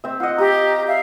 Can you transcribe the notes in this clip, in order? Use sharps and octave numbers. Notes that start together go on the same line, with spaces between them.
C4 E5
F4 D#5 F#5
G4 A#5 D#6
E5 F5